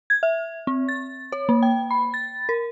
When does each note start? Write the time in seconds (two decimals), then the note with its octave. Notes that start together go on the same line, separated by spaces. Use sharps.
0.10 G#6
0.23 E5
0.67 C4
0.88 A6
1.32 C#5
1.49 A#3
1.63 G5
1.91 B5
2.14 A6
2.49 A#4